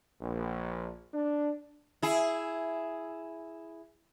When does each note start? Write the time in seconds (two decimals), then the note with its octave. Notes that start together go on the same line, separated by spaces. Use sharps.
0.21 A#1
1.13 D4
2.03 E4 G#4